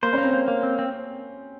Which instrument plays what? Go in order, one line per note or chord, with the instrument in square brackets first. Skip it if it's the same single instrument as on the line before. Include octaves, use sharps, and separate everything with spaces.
[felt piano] A#3 [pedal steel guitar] C5
[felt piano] C#4
[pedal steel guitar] A#3
[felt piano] C4
[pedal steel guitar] A#3
A#3
C4
C4